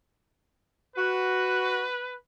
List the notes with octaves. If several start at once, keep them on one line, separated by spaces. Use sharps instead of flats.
F#4 B4